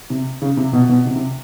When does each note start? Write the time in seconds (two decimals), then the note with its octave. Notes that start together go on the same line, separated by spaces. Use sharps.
0.10 C3
0.42 C#3
0.57 C3
0.73 B2
0.89 B2
1.06 C3
1.16 C3